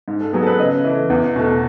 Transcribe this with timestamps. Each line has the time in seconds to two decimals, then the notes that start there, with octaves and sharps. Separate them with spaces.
0.08 G#2
0.20 A4
0.33 F#3 B3 G#4
0.43 A4
0.47 B4
0.59 C#3 D#5
0.84 E3 A3
1.10 E2
1.36 B2 A3